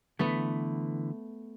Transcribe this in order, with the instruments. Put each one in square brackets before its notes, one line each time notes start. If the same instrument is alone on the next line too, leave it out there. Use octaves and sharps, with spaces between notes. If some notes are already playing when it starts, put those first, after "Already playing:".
[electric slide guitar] D3 E3 [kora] A3 B3